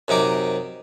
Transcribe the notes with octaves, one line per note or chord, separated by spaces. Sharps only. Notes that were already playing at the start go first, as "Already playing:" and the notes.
F#2 C3 D#4 D6